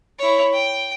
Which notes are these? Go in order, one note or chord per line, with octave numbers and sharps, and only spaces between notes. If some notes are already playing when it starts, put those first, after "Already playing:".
E4 C#5
G5